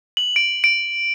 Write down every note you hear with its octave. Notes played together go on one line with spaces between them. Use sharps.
F#7
D7
D7